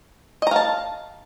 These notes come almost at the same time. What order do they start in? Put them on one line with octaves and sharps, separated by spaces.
D#5 A#5 F5 A5